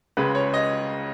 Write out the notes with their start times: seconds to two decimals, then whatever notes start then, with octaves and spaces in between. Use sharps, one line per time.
0.17 C#2 C#3 G#3 B4
0.35 C#5
0.54 D#5